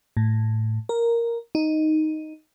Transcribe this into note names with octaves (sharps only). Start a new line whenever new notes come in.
A2
A#4
D#4